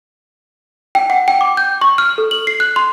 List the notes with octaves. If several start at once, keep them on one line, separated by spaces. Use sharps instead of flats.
G5
F#5
G5
D6
G6
C#6
F6
A4
F#7
C7
F#6
C6